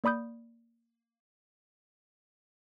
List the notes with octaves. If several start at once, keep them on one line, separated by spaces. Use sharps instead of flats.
A#3 D5 B5 D#6 G6